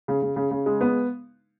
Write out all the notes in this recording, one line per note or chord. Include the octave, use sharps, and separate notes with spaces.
C#3
C#3
C#3
C#3
G#3
B3